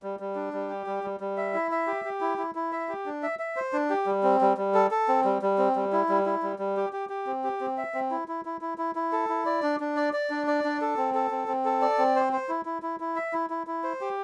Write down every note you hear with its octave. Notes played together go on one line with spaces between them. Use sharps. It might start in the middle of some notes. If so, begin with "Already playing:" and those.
G3
G3
D4
G3
G4
G3
G3
G3
E5
E4
E5
G4
G4
E4
E4
E4
E5
G4
D4
E5
E5
C5
D4
G4
G3
C4
G3
G3
A4
A4
C4
G3
G3
C4
G3
E4
G3
E4
G3
G3
G4
G4
G4
C4
G4
C4
E5
C4
E4
E4
E4
E4
E4
E4
A4
E4
D5
D4
D4
D5
D5
D4
D5
D4
A4
C4
A4
C4
C4
A4
D5
C4
C5
C5
E4
E4
E4
E4
E5
E4
E4
E4
C5
G4